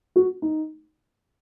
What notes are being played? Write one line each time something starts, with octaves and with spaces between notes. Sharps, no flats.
F#4
D#4